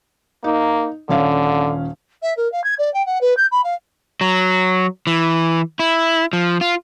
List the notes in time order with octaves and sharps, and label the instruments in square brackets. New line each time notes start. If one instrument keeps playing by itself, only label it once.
[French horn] A#3 [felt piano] D#4
[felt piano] D#1 C#4 F5 [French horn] D3
[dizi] E5
A#4
F5
G#6
D5
G5
F#5
B4
G6
B5
F5
[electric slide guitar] F#3
E3
E4
F3
F4